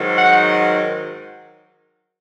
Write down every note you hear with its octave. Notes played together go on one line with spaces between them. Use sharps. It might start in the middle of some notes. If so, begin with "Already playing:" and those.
Already playing: G#2 D#3 F#3
F#5